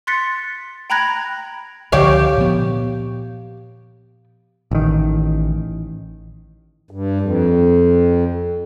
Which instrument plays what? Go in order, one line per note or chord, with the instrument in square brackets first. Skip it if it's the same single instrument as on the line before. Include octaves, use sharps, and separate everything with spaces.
[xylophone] C6 F#6 A6 B6 C#7
G5 A#5 B5 F#6 G#6 A#6
[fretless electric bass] C#2 D3 F3 [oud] G4 C#5 F5
[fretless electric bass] A#2 F3 B3
[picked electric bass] A1 D#3
[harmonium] G2
F2